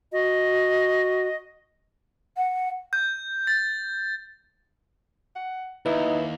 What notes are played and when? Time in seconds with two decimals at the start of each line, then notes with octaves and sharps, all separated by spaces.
0.12 F#4 D#5
2.37 F#5
2.93 G6
3.47 A6
5.36 F#5
5.86 D#2 D#4 E4 B4